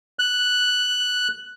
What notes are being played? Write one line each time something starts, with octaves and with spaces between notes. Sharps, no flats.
F#6